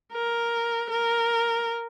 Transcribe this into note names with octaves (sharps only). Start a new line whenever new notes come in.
A#4
A#4